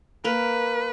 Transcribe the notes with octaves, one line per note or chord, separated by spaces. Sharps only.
A#3 A#4 B4